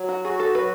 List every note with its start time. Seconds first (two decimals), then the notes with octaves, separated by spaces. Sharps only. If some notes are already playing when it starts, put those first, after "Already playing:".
Already playing: F#3
0.09 F#4
0.24 F#4 G#4
0.40 A4
0.55 F#3 B4